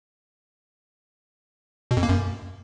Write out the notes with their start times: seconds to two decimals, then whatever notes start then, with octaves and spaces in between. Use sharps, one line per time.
1.91 B2
1.97 F2
2.03 A#3
2.09 F#2